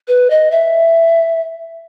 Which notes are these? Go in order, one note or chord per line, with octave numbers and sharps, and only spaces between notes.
B4
D#5
E5